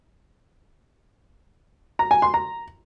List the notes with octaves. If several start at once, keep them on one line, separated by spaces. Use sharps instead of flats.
A#5
G#5
C6
A#5